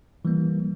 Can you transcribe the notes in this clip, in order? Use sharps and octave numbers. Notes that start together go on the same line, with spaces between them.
E3 G3 A#3